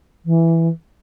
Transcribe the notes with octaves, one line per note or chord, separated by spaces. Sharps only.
E3